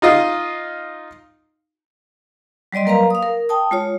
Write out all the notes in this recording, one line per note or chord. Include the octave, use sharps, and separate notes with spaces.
D#4 F4 D#5 F5
F#3 G3 D5 D#5 C6
F#3 A#3 A#4 B4 F5 A#5
F5 D#6
A#4
G5 A5 D#6
G#3 F4 C#5